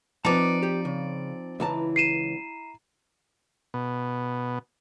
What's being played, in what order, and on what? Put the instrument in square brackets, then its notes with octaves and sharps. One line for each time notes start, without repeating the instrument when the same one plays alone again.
[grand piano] F3 C4 [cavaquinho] D#4 D5 [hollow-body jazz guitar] B4 A5
[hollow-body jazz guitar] G4
C#3
[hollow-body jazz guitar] C#2 E3 A5 [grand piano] E4 A#5
[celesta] C7 D#7 E7
[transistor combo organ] B2